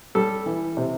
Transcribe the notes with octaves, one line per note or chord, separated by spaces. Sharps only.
G3 A4
E3
C3